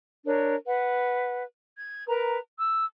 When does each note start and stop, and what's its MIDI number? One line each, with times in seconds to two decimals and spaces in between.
0.26 0.55 62
0.26 0.55 70
0.26 0.55 73
0.66 1.43 71
0.66 1.43 78
1.77 2.05 92
2.07 2.38 70
2.07 2.38 71
2.07 2.38 82
2.58 2.85 88